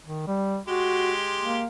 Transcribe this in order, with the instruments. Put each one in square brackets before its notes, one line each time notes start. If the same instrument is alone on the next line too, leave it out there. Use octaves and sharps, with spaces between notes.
[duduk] D#3
G3
[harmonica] G#3 G4 C6 [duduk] F#4
[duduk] A#3